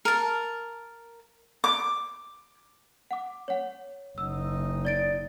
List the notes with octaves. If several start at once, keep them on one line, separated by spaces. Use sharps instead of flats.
A#4 A5
D6
F#5 D6
C#5 F#5
F#1 D#4 E6
D5 A6 D7